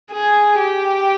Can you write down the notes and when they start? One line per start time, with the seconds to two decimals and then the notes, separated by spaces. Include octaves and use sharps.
0.12 G#4
0.60 G4